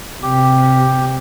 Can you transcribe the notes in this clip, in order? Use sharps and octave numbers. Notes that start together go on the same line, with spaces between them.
C3 G4